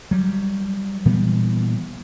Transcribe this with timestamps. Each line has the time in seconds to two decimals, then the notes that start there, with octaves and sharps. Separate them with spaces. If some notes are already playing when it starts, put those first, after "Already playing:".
0.11 F#3 G3
1.05 A#2 E3 G3 B3